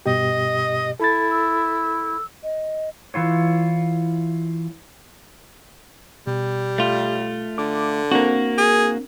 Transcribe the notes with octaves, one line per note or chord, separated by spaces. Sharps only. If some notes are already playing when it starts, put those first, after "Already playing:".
G2 B2 G4 D#5
E4 A4 A6
E6
D#5
E3 E4 F4 C#5
B2 G3
A3 F4
D3 D6
A#3 C4 D4 F#4 A#4
G#4